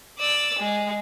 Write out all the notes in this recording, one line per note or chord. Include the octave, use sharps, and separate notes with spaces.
D5 E6
G#3